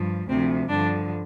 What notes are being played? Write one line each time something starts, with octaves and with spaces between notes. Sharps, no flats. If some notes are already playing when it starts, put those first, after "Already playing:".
Already playing: G2 F3
D2 C3 F3 C4
G2 D3 F3 D4